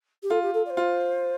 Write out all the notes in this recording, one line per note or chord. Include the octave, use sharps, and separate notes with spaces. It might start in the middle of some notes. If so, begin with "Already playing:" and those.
G4
F4 A4
G4
A4
D5
C5
F4